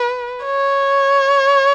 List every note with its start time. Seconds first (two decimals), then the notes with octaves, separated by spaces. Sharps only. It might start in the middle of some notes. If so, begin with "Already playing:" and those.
Already playing: B4
0.45 C#5